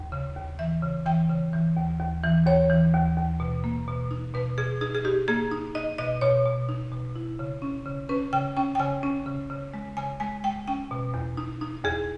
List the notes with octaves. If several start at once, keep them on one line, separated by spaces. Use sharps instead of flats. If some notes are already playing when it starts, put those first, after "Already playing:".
Already playing: D#2
C#3
D#2
E3 E5
C#3
E3 G5
C#3
E3
D#2
D#2
E3
D#2 C#5
E3
D#2
D#2
B2
A#3
B2
D#4
B2 B4
B2 G#4
D#4 G#4
G#4
D#4 G4
A#3 G#4
D#4
D#4 D#5
B2 D#5
B2 C#5
B2
D#4
B2
E4
C#3
C#4
C#3
C#4 B4
C#3 G5
C#4 G5
G5
C#3 G#5
C#4
C#3
C#3
G#3
C#3 G#5
G#3 G#5
G#3 G5
C#4 G5
B2
E2
D#4
D#4
E2 G#4